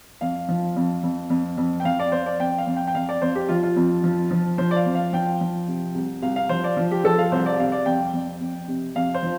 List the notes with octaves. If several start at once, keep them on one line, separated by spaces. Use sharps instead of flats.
F2 F5
F3
F2
F2
F2
F2
G5
F2 F5
D5
F2 C5
D5
F2 G5
F5
F2
G5
G5
F2 F5
D5
F2 C5
G4
F3 F4
F4
F2
F3
F3
F3 C5
D5
F5
F2
F5
F3 G5
F3
C3
C2
C2 F5
F5
F3 C5
D5
F3
G4
F3 A4
F5
C2 C5
D5
C3 F5
D5
F2 G5
F2
F2
C3
F2 F5
C5
F3